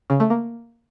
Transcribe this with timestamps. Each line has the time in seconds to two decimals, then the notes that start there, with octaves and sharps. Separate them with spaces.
0.10 C#3
0.20 A3
0.30 A#3